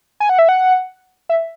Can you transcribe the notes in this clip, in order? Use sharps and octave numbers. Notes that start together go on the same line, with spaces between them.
G#5
F#5
E5
F#5
E5